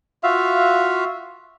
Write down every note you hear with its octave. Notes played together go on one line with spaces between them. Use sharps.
F4 F#4 E5 F5